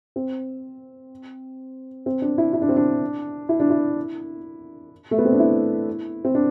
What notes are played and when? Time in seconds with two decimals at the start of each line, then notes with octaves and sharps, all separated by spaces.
0.16 C4
2.06 C4
2.22 D4
2.38 E4
2.53 E4
2.62 D4
2.69 C4
2.76 D4
3.49 E4
3.60 D4
3.70 E4
5.11 A3
5.18 B3
5.25 C4
5.32 D4
5.39 E4
6.25 C4
6.35 D4